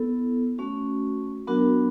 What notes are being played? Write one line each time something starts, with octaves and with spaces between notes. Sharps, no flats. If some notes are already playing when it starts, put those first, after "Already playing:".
Already playing: B3 E4 A4
A3 C#4 F#4
F#3 B3 D4 F#4 A#4